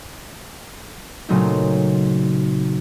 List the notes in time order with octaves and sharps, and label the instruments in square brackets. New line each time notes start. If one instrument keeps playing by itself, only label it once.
[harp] A#2 C#3 F#3 A3 C4 D#4